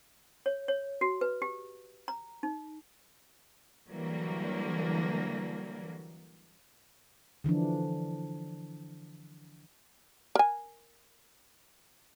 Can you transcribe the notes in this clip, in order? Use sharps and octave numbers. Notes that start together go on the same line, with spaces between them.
C#5
C#5
F#4
B4
G4
A#5
D#4
D3 E3 F#3 G3 A#3
D3 E3 F3 D4
A#4 G#5